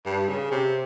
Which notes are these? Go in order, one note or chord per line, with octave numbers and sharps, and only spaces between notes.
G2
C#3
C3